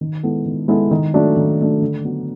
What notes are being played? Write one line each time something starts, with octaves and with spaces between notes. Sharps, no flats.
D#3
G#3 B3 E4 A4
D#3
G#3 B3 E4 A4
D#3
F#3 A3 D4
D#3
F#3 A3 D4
D3
F#3 B3